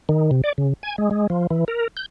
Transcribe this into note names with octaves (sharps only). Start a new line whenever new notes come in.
D#3
C3
D5
C#3
G#5
G#3
G#3
F3
E3
A#4
G6